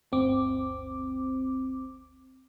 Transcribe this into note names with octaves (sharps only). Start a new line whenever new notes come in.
G1 D2 C4 D6